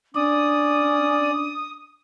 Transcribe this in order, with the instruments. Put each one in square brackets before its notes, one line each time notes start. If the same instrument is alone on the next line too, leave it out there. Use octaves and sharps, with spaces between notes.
[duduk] C#4 [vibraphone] D4 [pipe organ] D5 [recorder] D#6